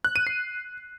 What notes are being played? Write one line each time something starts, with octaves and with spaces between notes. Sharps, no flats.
F#6
D#7
C7